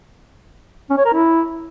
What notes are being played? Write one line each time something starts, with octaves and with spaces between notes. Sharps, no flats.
C#4
C#5
A#4
E4